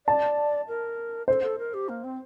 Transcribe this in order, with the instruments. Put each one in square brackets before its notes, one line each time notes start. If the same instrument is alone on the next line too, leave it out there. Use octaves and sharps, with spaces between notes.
[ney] D5 [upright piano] A5
[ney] A#4
[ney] A4 [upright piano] C5
[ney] A4
A#4
G4
A#3
C4